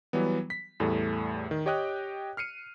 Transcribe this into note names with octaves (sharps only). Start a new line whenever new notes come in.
E3 F#3 G3 B3
B6
E2 A2 G3 A3
D#3
G4 C#5 D#5 G5 D#6 F#6
F6 C7 C#7 D#7